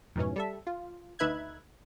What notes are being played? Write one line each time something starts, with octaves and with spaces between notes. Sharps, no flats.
F2 G#2 B2 E3 C#4
G3 A4 E5
F4
D2 D#4 B4 E5 F#6 G#6